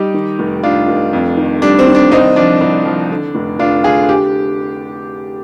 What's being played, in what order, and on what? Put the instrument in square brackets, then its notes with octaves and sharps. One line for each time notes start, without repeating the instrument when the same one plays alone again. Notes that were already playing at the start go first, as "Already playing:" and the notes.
Already playing: [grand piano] G3 D#4 G4
D#3
F1
F1 D4 F4
F1
F2
D#3
G3 D4
C4
D#3
D4
C2 C4 D#4
F3 D4
C2 D4
F3
D3
F1
F1 D4 F4
D3 F4 G#4
G4